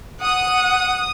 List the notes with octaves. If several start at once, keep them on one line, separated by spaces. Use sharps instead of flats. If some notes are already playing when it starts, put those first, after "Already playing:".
F#5 D#6